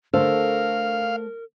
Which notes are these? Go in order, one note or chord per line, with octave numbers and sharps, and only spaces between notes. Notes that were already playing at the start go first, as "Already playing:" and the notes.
D3 A3 A4 A#4 C5 F5